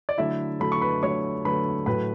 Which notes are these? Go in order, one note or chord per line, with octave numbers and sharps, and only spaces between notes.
D5
D3 F#3 A3 E4 E5
D3 F#3 A3 B5
C#6
B4 B5
D3 F#3 A3 C#5 C#6
D3 F#3 A3 B4 B5
A2 F#3 A3 B4 B5